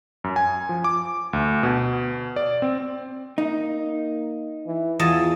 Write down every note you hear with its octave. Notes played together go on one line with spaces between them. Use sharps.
F#2
G#5
F3
D6
D2
B2
D5
C4
A#3 D#4
E3
E2 F4 D#5 A5